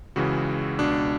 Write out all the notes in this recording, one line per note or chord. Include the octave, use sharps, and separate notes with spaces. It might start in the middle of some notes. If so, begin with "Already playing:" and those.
C#2 C#3 E3 F#4
C#2 B2 D4